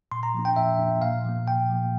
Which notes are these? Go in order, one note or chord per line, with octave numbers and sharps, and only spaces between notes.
A#2 C6
A#5
F3 A#3 D4
G5
A#2 E5
F3 A#3 D4
A#2 F5
F3 A#3
A#2 G5
F3 A#3